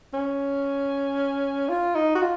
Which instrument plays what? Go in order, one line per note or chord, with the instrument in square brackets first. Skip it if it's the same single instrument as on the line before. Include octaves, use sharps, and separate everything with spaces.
[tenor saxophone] C#4
F4
D#4
F#4
F4